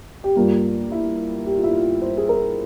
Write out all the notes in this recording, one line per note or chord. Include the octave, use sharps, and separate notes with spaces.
G4
G2 G3 A#3 F4
E4
G4
F4
E4
F4
C5
G#4
A#4